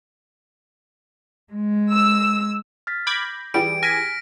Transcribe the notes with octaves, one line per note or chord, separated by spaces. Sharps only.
G#3
E6
F6 A6 B6
B5 D6 G6 G#6 A#6
E3 G3 G4 G#4 D7
G#5 F6 A#6 B6 D7